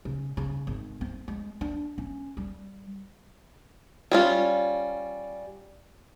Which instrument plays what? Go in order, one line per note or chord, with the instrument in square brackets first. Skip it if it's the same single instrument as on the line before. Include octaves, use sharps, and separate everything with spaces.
[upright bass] C#3
C#3
G#1
C4
G#3
D4
C#4
G3
[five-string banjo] G3 C#4 F4